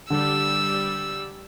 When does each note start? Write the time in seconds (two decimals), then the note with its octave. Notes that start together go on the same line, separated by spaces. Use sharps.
0.10 D3 G3 E6